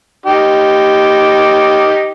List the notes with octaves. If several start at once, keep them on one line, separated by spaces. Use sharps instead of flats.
D#4 G4